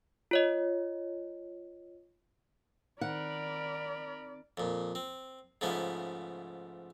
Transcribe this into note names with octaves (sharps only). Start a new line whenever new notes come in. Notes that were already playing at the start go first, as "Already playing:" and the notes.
F4 C#5 D#5
D#3 C4 A#4 D5 F#5 B5
F2 A#2
C4
G#2 C#3 F3 A3 B3